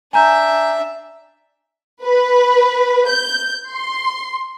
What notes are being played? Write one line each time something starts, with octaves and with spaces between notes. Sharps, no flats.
D4 E5 G#5 A#5 G6
B4
G6
C6